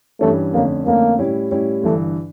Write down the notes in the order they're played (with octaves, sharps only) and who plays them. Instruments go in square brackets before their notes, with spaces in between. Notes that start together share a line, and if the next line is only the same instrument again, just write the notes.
[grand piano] G2 E3 G3 C#4 [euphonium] A3
[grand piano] F2 D3 A3 C#4 [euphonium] A#3
[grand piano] F2 D3 A3 C#4 [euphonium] A#3
[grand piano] A2 G3 C#4 E4 G4
A2 G3 C#4 E4 G4
[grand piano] G1 G2 E3 [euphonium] A3